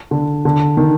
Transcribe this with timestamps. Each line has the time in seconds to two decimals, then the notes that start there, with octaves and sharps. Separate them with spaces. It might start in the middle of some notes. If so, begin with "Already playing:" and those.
0.11 D3
0.45 D3
0.77 D#3